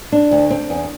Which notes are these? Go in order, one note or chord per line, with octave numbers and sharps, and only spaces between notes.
D4
D2
C4
E2